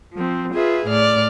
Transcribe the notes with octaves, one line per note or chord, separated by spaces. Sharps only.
F3 C4
F4 G#4 B4 E5
A2 D5 F6